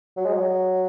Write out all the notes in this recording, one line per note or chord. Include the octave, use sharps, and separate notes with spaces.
F#3
G#3
F#3